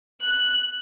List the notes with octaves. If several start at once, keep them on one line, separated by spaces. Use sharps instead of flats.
F#6